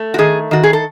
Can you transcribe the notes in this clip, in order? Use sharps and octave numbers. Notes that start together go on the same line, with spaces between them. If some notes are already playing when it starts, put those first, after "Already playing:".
Already playing: A3
F#4
D#3 G#4
D#3 F#4
G#4
A4